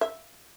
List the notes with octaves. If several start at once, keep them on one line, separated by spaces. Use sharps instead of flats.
E5